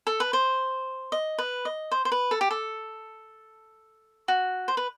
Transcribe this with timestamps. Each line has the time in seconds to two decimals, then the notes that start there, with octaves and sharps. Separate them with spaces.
0.07 A4
0.20 B4
0.33 C5
1.12 D#5
1.38 B4
1.65 D#5
1.91 C5
2.05 C5
2.12 B4
2.31 A4
2.41 G4
2.51 A4
4.28 F#4
4.68 C5
4.77 B4